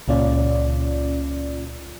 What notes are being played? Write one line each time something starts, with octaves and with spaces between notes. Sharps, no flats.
C#2 A#2 C#4 F4 D5